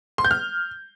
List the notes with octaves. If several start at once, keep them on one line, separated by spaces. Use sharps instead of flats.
C6
G6
F6